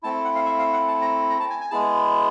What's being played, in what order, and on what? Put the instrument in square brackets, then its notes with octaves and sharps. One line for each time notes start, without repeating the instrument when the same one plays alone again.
[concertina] A3 C4 E4 A5
F#5
F5
E5
F5
F#5
A5
A#5
A#5
A5
G#5
G#5
G#3 B3 E4 G#4 A5